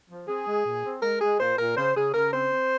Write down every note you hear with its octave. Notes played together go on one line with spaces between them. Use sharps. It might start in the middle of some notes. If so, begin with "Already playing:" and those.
F3
C4 G#4
G#3
A#2
C4
G#3 A#4
G#3 G#4
A#2 C5
A#2 A#4
C#3 C5
C#3 G#4
C#3 A#4
C4 C5
C4